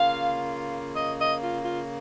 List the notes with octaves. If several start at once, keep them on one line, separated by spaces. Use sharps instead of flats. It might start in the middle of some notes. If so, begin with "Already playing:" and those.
Already playing: C#3 A#3 F4 F5
D#5
D#5
F4
F4